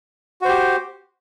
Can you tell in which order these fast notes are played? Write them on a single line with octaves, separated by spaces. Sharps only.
F#4 C5 G4